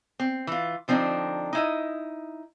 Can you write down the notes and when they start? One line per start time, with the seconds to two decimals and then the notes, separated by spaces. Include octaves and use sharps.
0.20 C4
0.47 E3 F4
0.88 D3 F3 C4 D4 D#4
1.53 D#4 E4 D#5